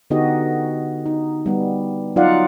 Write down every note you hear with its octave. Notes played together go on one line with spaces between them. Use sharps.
D3 B3 D#4 F#4 G4 D#5
D#4
G3 B3
F#3 D#4 F4 D5 F5 F#5